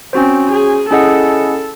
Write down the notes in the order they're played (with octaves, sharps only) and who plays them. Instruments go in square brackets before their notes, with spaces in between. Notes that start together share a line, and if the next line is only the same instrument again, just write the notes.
[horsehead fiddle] C4 [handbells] C#4 F#4 C5
[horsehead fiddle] G#4
[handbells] C#4 E4 G#4 D#5 F#5 [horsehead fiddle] A4